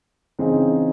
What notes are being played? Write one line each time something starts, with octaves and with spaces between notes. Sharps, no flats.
C#3 E3 C4 D#4 G#4